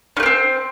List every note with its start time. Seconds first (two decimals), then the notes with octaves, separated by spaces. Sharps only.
0.17 C#4
0.20 A3
0.23 A#3
0.26 C4